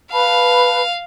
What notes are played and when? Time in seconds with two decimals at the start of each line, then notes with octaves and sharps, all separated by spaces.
0.12 B4 F5 A5 B5